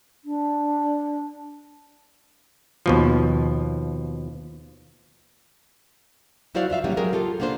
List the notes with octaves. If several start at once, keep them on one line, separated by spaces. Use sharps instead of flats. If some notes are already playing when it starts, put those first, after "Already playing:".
D4
D#2 B2 F3
F#3 E4 F#4 C5 D5 F5
F2 F4 E5 F5
F#3 G3 A#3 B3 C#4
F#3 G#3 G4 G#4 A#4
F4 G4 A4
A#3 B3 D4 F4 C5